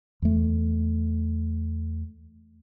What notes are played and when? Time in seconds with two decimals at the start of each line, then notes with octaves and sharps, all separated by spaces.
0.22 E2 A3